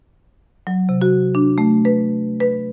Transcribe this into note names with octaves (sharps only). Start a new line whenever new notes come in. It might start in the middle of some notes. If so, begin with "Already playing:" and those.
F#3
C3
F#4
D4
A3
B4
B4